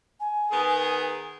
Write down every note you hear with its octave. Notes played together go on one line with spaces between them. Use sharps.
G#5
D#3 B3 G#4